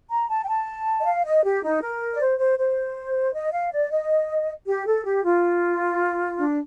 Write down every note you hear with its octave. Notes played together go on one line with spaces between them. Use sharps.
A#5
A5
G5
A5
D#5
F5
D#5
G4
D#4
A#4
D5
C5
C5
C5
D#5
F5
D5
D#5
G4
A4
G4
F4
D4